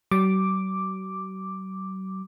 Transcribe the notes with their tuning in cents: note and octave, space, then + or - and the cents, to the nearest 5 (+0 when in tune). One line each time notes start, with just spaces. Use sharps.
F#3 +45 D6 +0